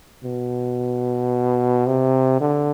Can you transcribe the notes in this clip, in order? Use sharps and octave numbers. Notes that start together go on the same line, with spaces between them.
B2
C3
D3